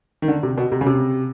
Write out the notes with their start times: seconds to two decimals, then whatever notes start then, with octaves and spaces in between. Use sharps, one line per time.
0.22 D#3
0.28 D3
0.43 C3
0.58 B2
0.72 C3
0.81 C#3
0.86 C3